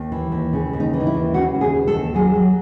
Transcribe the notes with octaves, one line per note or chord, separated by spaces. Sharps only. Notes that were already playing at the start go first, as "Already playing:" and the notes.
Already playing: D#2
E3
D#2
C#3
D#2
D#4
E3
D#4
E4
D#2
C#3 F#4
D#2
G#4
E3
A4
D#2
F#3 G#4
F#3